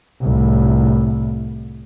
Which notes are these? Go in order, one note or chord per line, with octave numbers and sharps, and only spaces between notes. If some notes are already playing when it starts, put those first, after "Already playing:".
C2 A2